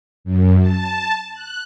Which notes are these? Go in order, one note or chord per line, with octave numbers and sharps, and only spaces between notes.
F#2
A5
F#6